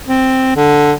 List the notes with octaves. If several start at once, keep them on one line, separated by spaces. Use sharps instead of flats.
C4
D3